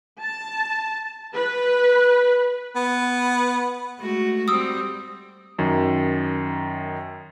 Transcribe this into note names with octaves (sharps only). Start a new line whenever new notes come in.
A5
B4
B3
G#3 A3 F#4
G3 C4 D#6 E6
F#2 D#3